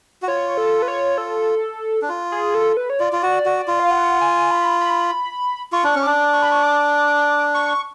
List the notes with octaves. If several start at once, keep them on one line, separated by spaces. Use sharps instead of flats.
F#4
F4 C#5
A4
B4
C#5
A4
D4
F4
G#4
A4
B4
C#5
F4 D5
F4
F#4
F#4
F4
F5
F#5
G#5
B5
B5
F4 C#6
D4
C#4
D4 D6
C#6
B5
C#6
D6
C#6